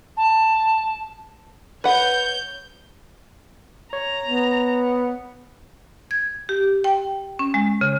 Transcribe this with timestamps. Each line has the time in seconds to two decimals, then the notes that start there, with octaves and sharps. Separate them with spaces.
0.17 A5
1.84 B4 C#5 F#5 G6
3.93 C#5 A#5
4.25 B3
6.11 G#6
6.49 G4
6.84 G5
7.39 C#4
7.54 G#3
7.81 C#3